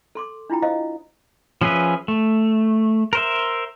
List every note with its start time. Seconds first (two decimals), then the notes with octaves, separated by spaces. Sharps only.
0.15 A4 C6 D6
0.50 D4 E4 F4 G5 A#5
0.62 C5 D#5 F5 A#5 D#6
1.61 F3 C#4 G#4 B4 E5
2.08 A3
3.13 A#4 C5 E5